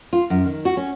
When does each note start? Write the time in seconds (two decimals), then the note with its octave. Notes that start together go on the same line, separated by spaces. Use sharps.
0.13 F4
0.30 F#2
0.45 D#3
0.65 F#4
0.77 C#4